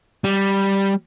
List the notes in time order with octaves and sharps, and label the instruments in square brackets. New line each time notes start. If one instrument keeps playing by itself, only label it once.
[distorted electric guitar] G3